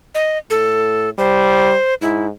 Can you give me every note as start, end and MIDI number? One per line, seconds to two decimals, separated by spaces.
0.15 0.38 75
0.50 1.11 45
0.50 1.10 69
1.18 1.75 55
1.18 1.94 72
2.02 2.30 44
2.02 2.26 64